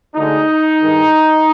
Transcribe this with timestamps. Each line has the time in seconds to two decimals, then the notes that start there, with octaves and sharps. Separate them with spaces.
0.15 D2 D3 G#3 D#4
0.80 G2 D#3 G#3